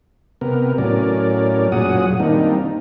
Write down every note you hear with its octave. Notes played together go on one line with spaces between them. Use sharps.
C3 B3 A#4
A2 F#3 C#4 A#4 D5
F#2 A#2 F#3 G#4 F#5 D#6
D#3 G3 A#3 C4 D4 D#4